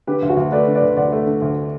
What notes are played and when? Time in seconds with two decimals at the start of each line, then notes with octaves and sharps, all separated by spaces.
0.07 D3 G4 B4
0.22 D2
0.30 F#4
0.37 D2
0.52 A3 B4 D5
0.67 D3
0.75 B4 D5
0.82 D2
0.97 D2 D5 F#5
1.12 A3
1.27 D3
1.42 D2